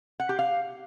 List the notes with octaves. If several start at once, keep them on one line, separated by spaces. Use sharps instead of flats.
F#5
G4
F5